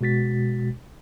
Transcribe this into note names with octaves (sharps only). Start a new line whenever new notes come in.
B2 G#3 F#4 A6 B6